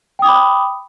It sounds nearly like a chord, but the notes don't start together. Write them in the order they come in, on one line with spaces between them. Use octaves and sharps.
G5 D#6 D6 B5